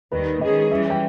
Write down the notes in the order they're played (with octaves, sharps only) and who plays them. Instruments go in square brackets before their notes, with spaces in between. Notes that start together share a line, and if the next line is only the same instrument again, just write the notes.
[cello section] D#2 D#3 G3 [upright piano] B4
[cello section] D#3 G#3 C#4 G#4 [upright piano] D#5
[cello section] E3 G3 C#4 [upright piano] E5
[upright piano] G5